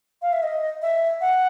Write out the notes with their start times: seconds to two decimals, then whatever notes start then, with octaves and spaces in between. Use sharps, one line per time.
0.22 F5
0.32 E5
0.43 D#5
0.82 E5
1.21 F#5